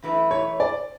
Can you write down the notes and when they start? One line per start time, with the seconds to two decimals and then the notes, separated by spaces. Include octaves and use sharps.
0.02 F#2 E3 A3 E4 B4
0.31 C#5
0.60 D5